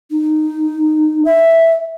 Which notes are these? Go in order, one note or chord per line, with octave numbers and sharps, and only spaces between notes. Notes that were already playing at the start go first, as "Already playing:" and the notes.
D#4
E5